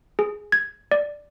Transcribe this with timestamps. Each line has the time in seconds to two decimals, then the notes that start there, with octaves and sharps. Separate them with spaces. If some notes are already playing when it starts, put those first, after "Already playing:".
0.19 G#4
0.52 G#6
0.91 D5